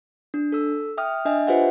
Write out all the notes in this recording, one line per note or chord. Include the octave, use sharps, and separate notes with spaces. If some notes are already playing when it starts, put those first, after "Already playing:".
D4
A4 E6
E5 G5 D#6 F6
D4 D#5 E5 G#5
F4 G4 B4 C5 E5 F#5